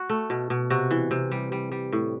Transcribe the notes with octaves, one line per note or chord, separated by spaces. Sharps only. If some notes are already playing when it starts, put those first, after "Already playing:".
Already playing: F#4
A3
B2
B2
C3 F#4
E3
C3
G3
G3
G3
A2